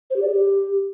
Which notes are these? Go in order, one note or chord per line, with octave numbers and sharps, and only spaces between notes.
C5
G4
D5
G#4
G4